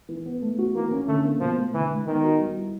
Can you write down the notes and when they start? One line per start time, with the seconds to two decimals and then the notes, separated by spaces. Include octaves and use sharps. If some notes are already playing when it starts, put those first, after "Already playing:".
0.09 E3
0.26 B3
0.42 A3
0.59 F#4
0.75 E3 A#3
0.91 C#4
1.08 D3 A3
1.24 A#3
1.41 B2 F3
1.57 A3
1.74 D3 E3
1.90 G#3
2.07 D#3 B3
2.23 F#4
2.40 G3
2.57 E4